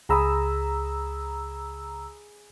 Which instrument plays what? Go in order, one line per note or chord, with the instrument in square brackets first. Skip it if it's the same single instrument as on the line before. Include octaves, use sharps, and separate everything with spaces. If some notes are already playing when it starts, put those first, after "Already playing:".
[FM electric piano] C#2 A#5 E6 [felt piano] G#4 B5 D#6